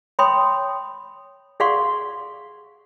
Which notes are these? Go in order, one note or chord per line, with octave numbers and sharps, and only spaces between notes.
C#5 G5 B5 C6 D#6
G#4 D5 F5 F#5 C6 C#6